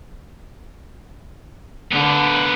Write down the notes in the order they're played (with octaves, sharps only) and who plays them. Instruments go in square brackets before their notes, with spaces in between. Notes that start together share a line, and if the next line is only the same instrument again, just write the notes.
[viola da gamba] D3 [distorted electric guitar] B3 A#4